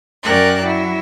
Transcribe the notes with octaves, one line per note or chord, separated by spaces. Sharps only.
F#2 C#4 A#4 D5 G5 F#6
F#3 E4